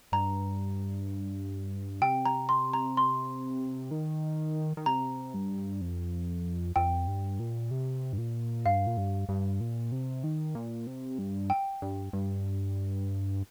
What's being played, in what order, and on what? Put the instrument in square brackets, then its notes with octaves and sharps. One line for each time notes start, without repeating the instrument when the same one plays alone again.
[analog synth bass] G2 [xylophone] A#5
[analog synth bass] C3 [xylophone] G5
[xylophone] A#5
C6
A#5
C6
[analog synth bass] D#3
D#3
[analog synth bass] C3 [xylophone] A#5
[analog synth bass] G2
F2
[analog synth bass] F2 [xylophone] G5
[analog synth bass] G2
A#2
C3
G2
A#2
[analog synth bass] G2 [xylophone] F5
[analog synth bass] A#2
G2
G2
A#2
C3
D#3
A#2
C3
G2
[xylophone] G5
[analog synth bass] G2
G2